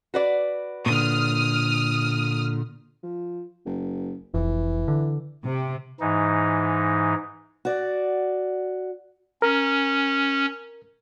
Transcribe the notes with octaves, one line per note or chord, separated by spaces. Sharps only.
F#4 B4 D5
A#2 D3 D#6 F6
F3
F#1
F1 E3
D3
C3
G#2 E3 D#4
F#4 D5
C#4 A#4